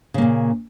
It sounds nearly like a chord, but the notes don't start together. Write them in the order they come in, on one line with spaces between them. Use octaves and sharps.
C#3 A#3 A#2